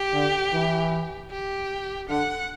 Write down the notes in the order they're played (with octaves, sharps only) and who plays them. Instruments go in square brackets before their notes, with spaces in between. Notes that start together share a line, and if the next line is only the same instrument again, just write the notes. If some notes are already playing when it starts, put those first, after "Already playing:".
Already playing: [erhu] G4
[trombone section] D3
E3
[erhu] G4
[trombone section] D3 [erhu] F#5